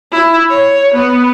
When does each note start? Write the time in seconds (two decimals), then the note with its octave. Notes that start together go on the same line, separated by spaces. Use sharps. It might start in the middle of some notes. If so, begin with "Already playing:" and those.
0.12 E4
0.50 C#5
0.94 B3